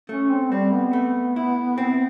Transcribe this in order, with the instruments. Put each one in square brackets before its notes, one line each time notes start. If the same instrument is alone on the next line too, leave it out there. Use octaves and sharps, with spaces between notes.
[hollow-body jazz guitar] A3 [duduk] C#4
[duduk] C4
[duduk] G3 [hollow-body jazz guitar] C4
[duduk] B3
[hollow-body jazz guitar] A3
E4
C4